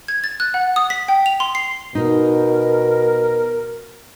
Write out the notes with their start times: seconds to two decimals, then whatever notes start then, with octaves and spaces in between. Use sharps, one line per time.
0.08 G#6
0.24 A6
0.40 F#6
0.54 F#5
0.76 D#6
0.90 B6
1.08 G5
1.26 F7
1.40 C6
1.55 C7
1.95 B2 D#4 A#4